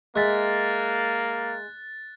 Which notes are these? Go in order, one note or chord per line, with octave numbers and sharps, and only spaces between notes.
G#3 A#3 E5 F#6 A6